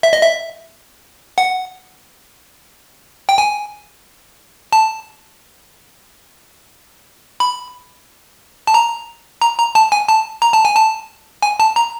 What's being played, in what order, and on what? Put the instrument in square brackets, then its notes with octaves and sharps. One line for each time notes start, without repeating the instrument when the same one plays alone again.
[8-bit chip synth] E5
D#5
E5
F#5
G5
G#5
A5
B5
A5
A#5
A#5
A#5
A5
G#5
A5
A#5
A5
G#5
A5
G#5
A5
A#5